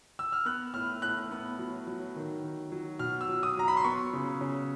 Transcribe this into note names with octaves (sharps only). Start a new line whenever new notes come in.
E6
F6
B3 F#6
A2 F6
A2 F#6
B3
F#3
F#3
D#3
D#3
F#3
B2 F6
E6
F#3
D#6
F#3 A#5
B5
C6
B3 C#6
C#3
C#3